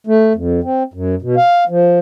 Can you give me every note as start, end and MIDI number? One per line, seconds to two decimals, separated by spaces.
0.07 0.33 57
0.35 0.60 41
0.64 0.83 60
0.94 1.15 42
1.22 1.36 47
1.37 1.64 77
1.69 1.99 53